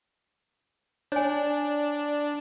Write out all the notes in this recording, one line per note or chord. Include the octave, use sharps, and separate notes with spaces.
D4 C#5 G#5